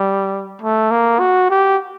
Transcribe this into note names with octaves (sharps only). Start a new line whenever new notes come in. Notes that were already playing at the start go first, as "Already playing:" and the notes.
Already playing: G3
A3
A#3
F#4
G4